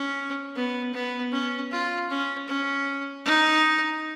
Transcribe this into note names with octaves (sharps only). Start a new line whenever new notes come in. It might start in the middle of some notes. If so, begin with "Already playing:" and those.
Already playing: C#4
B3
B3
C#4
F4
C#4
C#4
D#4